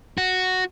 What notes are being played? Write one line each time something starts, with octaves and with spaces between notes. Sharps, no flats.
F#4